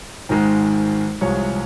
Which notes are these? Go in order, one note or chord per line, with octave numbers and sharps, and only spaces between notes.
G#1 G#2 D#3 G#3
C2 C3 F3 G#3 C#5